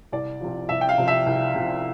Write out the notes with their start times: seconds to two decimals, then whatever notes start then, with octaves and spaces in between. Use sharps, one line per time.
0.12 C2 D5
0.41 C3 F3
0.69 C2 E5
0.81 G5
0.89 F5
0.98 C3 F3
1.08 E5
1.26 C2
1.55 C3 F3